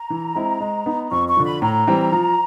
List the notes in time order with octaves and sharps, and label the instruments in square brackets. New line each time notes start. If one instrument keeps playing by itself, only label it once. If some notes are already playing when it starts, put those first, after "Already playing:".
Already playing: [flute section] A#5
[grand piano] E3
G#3 C4 E4
G#3
B3 D#4
[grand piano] F2 [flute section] C#6
[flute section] C#6
[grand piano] D3 F3
[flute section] B5
[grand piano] A2 [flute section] A#5
[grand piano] E3 G3 C4
F3